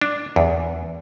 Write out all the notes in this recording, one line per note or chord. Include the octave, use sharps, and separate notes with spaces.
D4
E2